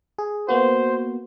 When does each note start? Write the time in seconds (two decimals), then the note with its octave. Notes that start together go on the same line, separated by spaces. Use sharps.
0.18 G#4
0.49 A#3 B3 F#4 C5